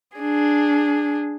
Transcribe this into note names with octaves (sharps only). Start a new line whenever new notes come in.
D4 G#4